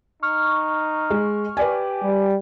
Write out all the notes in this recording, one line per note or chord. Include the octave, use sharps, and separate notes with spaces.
D#4 C#6 F6
G#3
G4 B4 D5 G#5
G3